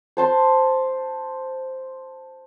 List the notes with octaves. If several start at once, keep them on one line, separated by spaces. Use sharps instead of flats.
C5 A5 C6